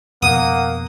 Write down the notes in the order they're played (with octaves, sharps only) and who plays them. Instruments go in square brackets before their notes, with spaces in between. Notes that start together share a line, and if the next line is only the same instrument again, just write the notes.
[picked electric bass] F2 B2 [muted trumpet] A#3 [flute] F#5 [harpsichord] D#6